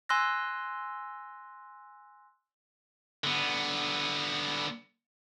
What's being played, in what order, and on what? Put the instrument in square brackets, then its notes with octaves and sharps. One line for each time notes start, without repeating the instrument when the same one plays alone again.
[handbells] G#5 C6 E6 F#6 A#6
[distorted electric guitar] D3 B3